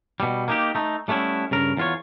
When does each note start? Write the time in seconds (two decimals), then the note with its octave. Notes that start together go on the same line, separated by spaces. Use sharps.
0.20 B2 G3
0.48 A#3 D#4 G4
0.75 A3 D#4
1.08 G3 A3 B3 C#4 E4
1.51 G2 C#3 A#4
1.77 E2 F4 C#5